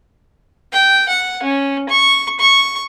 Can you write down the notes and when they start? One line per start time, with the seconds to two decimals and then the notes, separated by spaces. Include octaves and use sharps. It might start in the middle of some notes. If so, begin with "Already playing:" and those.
0.73 G5
1.09 F#5
1.43 C#4
1.89 C#6
2.40 C#6